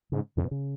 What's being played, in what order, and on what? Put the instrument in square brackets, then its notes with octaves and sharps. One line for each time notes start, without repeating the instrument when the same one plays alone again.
[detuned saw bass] G#2 [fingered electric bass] C#3
[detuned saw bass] F2 [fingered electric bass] C#3
[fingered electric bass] B2
C#3